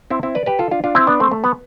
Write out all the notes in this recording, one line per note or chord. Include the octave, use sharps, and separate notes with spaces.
C4 E4
C4 E4
B4 D5
G4 B4
F4 A4
D4 F4
D4 F4
C4 E4
B3 D4
A3 C4
A3
B3